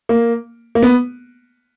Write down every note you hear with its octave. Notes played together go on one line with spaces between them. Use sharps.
A#3
A#3
B3